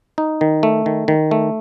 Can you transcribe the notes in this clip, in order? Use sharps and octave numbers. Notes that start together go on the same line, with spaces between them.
D#4
D#3
A3
D#3
D#3
A3